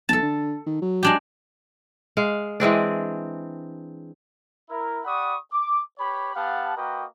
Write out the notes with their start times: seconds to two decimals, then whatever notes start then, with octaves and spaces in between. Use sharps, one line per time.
0.09 B1 A4 A5
0.22 D3
0.66 D#3
0.82 F#3
1.03 G#3 D4 G4
2.17 G#3 F5
2.60 E3 G#3 C4 D4
4.70 E4 A#4
5.04 G4 D5 F#5 B5 C#6 D#6
5.52 D6
5.99 G4 B4 C#5 B5
6.35 B3 G4 F5 F#5 A5
6.77 A#3 F#4 A#4 B4 D#5 G5